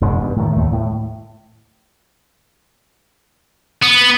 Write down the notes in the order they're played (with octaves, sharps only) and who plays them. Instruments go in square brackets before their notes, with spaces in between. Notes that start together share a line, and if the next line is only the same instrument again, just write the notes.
[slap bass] E1 G#2 B2 G#3
G2
A2 D#3
D#2 A3
A2
[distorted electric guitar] B3